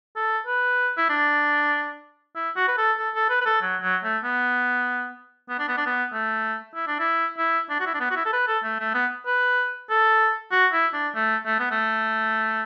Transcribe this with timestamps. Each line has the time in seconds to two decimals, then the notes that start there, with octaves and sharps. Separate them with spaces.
0.16 A4
0.47 B4
0.97 E4
1.09 D4
2.35 E4
2.56 F#4
2.68 B4
2.78 A4
2.98 A4
3.15 A4
3.30 B4
3.41 B4
3.46 A4
3.62 F#3
3.82 F#3
4.04 A3
4.24 B3
5.49 B3
5.59 D4
5.68 B3
5.78 D4
5.86 B3
6.12 A3
6.75 E4
6.87 D4
6.99 E4
7.38 E4
7.70 D4
7.80 F#4
7.86 E4
7.94 D4
8.00 B3
8.11 F#4
8.16 E4
8.25 A4
8.33 B4
8.48 A4
8.64 A3
8.80 A3
8.95 B3
9.27 B4
9.90 A4
10.52 F#4
10.73 E4
10.94 D4
11.15 A3
11.46 A3
11.59 B3
11.71 A3